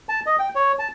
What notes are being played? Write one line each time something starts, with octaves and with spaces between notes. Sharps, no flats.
A5
D#5
G5
C#5
A5